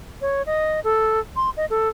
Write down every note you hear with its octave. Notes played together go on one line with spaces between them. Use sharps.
C#5
D#5
A4
C6
D#5
A4